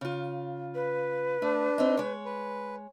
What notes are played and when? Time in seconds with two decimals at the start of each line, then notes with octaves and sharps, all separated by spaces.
0.01 C#3 F4
0.75 B4
1.42 A3 D4
1.78 C4 D#4
1.97 G#3 C#5
2.25 B4